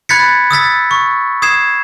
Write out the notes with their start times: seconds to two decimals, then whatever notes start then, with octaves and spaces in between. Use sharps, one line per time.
0.09 B5 F#6 G#6 A6 B6 C#7
0.51 D#6 E6 A6 B6
0.91 C#6
1.42 D#6 G#6 C7 E7